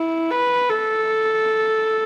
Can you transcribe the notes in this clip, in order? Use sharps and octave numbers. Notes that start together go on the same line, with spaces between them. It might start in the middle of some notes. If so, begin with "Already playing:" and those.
Already playing: E4
B4
A4